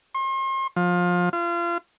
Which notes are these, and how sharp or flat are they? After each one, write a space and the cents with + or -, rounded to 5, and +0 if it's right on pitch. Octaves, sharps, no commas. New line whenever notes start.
C6 +40
F3 +25
F4 -30